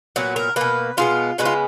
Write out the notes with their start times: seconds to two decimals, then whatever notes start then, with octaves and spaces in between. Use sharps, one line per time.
0.16 A#2 F#3 B3 F#4
0.36 A#4
0.56 B2 A#3 B4
0.97 B2 G#3 B3 F4
1.38 C#3 G#3 B3 F#4
1.45 F4